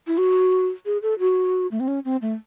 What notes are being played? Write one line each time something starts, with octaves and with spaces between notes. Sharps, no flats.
E4
F#4
G#4
A4
F#4
A3
C4
C#4
C4
A3